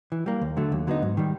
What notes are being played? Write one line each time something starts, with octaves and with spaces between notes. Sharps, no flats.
E3
G3 A#3
D#2
D3 F#3 A3
D#2
D3 F#3 B3 D#4
G#2
D#3 G3